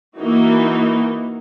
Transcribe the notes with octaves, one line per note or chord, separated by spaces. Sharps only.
E3 A#3 D#4 E4 F#4